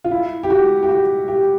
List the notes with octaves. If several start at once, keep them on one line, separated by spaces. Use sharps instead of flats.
F4
E4
G4
F#4
G4
F#4
G4